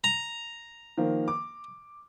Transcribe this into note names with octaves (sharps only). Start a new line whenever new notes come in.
A#5
D#3 F3 A#3
D6